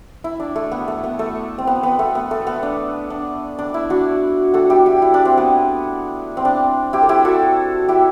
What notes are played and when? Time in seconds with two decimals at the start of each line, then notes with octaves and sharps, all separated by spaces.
0.24 E4
0.40 D4
0.56 A3
0.72 B3
0.88 A3
1.04 B3
1.19 A3
1.58 C4
1.67 B3
1.83 B3
1.99 A3
2.15 B3
2.31 A3
2.47 B3
2.63 D4
3.10 D4
3.59 D4
3.74 E4
3.90 D4 F#4
4.54 F#4 A4
4.70 E4 G4
4.86 E4 G4
5.02 E4
5.14 D4
5.25 C4
5.37 B3
6.37 C4
6.45 D4
6.93 E4 G4
7.02 A4
7.09 E4 G4
7.25 F#4 A4
7.88 E4 G4